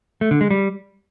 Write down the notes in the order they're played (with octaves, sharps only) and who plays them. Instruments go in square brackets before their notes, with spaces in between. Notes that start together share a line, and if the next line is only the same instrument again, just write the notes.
[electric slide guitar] A3
D3
G#3
G3